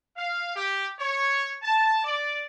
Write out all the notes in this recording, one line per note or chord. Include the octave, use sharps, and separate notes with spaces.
F5
G4
C#5
A5
D5